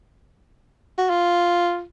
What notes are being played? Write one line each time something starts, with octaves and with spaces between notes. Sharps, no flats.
F#4
F4